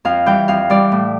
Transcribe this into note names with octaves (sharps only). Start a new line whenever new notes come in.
F2 F5
E3 G3 G5
F2 F5
E3 G3 D5
A2